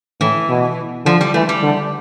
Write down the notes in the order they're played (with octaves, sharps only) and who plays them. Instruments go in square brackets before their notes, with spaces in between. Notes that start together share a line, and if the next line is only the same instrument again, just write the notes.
[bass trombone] A2 [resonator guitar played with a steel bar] E3
[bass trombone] B2
[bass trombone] D3 [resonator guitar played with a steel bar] F3
[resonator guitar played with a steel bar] G3
[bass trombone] E3 [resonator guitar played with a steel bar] A3
[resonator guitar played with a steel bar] G3
[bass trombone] D3